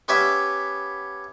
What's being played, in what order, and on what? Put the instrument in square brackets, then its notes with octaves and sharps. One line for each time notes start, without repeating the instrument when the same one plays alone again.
[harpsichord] B3 C#4 G4 B4 E5